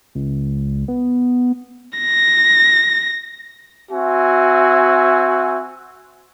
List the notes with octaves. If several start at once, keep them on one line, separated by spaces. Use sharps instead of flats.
C#2
B3
A#6
C4 F#4 E5 G#5